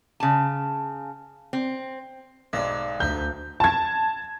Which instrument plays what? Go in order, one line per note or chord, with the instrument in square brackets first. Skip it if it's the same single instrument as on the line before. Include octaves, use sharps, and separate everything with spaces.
[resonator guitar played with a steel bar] C#3 A5
C4
[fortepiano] B1 G#2 [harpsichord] D#4 D5 E5
[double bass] D2 [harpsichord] D#4 E5 [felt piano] G6
[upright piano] A5 G#6